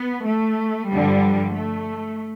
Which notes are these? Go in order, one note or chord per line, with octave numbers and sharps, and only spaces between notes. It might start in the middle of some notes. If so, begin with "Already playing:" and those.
Already playing: B3
A3
G2 D3 F3 G3
A3